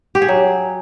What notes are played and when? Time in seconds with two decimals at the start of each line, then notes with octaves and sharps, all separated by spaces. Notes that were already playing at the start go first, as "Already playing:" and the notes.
0.15 G4
0.22 G#4
0.28 F#3